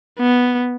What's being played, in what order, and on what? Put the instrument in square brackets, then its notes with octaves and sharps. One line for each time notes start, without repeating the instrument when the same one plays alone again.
[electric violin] B3